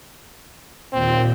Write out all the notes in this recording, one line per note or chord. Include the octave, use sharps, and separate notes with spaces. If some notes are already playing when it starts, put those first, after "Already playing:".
D#2 A#2 C4